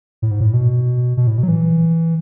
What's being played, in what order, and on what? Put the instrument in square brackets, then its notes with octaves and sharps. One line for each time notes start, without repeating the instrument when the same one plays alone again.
[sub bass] A2
G#2
A2
B2
B2
A2
B2
F#3
E3